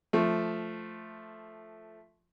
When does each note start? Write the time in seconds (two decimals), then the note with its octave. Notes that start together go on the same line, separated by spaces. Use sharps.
0.13 F3 A3